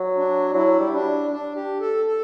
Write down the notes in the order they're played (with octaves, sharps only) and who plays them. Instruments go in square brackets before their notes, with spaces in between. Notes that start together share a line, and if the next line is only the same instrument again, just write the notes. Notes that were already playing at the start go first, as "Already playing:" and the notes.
Already playing: [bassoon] F#3
[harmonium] D4
[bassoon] F#3 [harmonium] E4
[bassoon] G3
[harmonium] D4
D4
G4
A4
A4